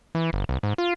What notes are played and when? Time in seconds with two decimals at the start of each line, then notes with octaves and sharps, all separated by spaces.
0.15 E3
0.33 G1
0.49 C2
0.63 G#2
0.78 F4